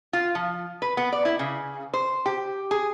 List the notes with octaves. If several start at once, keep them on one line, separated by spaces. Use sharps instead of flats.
F4
F3
B4
B3
D5
E4
C#3
C5
G4
G#4